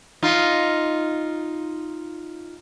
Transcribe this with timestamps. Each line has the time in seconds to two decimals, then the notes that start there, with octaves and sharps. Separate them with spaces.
0.23 D#4 F4